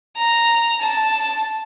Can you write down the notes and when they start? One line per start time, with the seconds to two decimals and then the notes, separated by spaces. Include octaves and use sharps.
0.17 A#5
0.81 A5